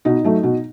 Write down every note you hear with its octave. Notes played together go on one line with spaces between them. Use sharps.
B2 D#4
F#3 A3
B2